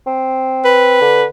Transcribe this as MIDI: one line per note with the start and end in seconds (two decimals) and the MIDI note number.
0.06 1.00 60
0.65 1.25 71
1.01 1.25 50